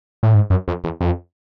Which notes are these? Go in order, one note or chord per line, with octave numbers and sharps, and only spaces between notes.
A2
G#2
F#2
F2
E2
F2